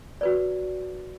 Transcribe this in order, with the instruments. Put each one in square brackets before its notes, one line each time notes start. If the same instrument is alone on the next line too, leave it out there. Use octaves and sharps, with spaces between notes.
[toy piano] F#4 B4 D5